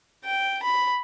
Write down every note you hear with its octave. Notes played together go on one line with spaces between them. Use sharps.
G5
B5